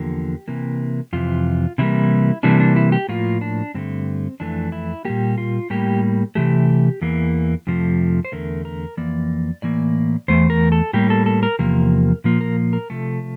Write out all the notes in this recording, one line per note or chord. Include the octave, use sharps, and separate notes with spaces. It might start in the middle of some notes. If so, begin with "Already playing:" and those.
Already playing: E2 D3 F3 A#3 G4
C3 E3 A#3
F2 C3 E3 F4
C3 E3 G3 A#3 E4
C3 E3 G3 A#3 D4
D4
E4
G4
A2 F3 A#3 F4
D4
G2 D3 A3 C4
F2 E3 A3 D4
E4
A#2 G3 A#3 G4
F4
A2 G3 A#3 G4
C3 E3 A3 G4
E2 E3 A#3
F2 C3 F3 A3
C5
E2 D3 A3 A#4
A#4
F2 E3 A#3 D5
A2 E3 A#3 D5
E2 E3 A3 C5
A#4
A4
A2 G3 A#3 G4
A4
A4
A#4
E2 C3 F3 A#3 A#4
A#2 F3 A#3
A#4
A#4
C3 F3 A3 A4